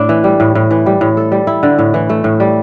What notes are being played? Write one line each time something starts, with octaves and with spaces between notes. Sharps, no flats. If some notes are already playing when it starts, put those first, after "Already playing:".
Already playing: A2 A3 D4 E4
E3
G3
A2
A2
E3
G3
A2
A4
G3
E4
D3
A2
E3
A3
A2
G3